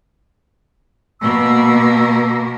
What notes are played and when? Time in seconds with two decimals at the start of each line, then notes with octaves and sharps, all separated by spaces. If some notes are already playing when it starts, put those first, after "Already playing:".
1.22 B2 A#3 E6